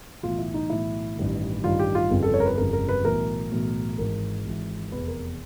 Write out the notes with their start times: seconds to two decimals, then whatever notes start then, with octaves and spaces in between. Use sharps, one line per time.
0.23 B1 A2 E3 F4
0.38 E4
0.54 D#4
0.70 B1 A2 E3 E4
1.17 A1 G2 D#3
1.64 A1 G2 D#3 F4
1.79 G4
1.95 F4
2.10 G1 F2 C#3
2.23 A4
2.34 C#5
2.40 A#4
2.46 B4
2.58 G1 F2 C#3 A#4
2.73 A#4
2.89 B4
3.04 B1 A2 E3 A#4
3.51 B1 A2 E3
3.98 G#1 G#2 E3 A#4
4.45 G#1 G#2 E3
4.92 F1 E2 C3 B4
5.08 A#4